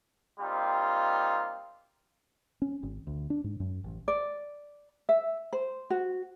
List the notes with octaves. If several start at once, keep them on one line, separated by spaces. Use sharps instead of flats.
G3 A#3 C4 D#4 F4
C#4
G#1
D2
D4
G#2
F#2
A1
D5
E5
C5
F#4